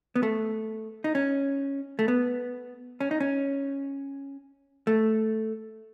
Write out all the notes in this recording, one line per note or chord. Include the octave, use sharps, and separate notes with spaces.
B3
A3
D#4
C#4
A3
B3
C#4
D#4
C#4
A3